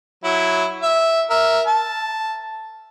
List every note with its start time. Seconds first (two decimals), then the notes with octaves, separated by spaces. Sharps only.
0.24 F#3 E4
0.83 E5
1.30 A#4 E5
1.67 A5